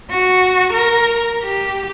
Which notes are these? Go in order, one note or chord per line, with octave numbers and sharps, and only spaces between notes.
F#4
A#4
G4